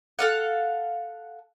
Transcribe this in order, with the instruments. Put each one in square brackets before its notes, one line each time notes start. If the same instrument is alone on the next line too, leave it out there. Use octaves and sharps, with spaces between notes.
[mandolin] A4 F5 F#5